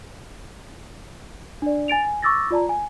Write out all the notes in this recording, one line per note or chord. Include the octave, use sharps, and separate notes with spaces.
D4 D5
G#5 A6 D7 F7
G#5
C#6 D6 E6 A6 A#6
F4 D5 A5 A#5
G#5